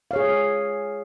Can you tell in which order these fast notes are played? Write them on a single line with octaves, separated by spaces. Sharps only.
F5 C#5 G#4